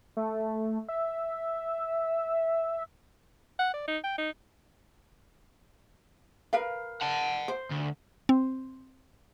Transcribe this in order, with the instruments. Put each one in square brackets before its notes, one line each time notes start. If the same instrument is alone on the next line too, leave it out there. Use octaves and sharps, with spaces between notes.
[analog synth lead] A3
E5
[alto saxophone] F#5
D5
D#4
G5
D#4
[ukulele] A#4 B4 F5
[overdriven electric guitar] F#5 A5
[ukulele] C5
[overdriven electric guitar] D2
[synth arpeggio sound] C4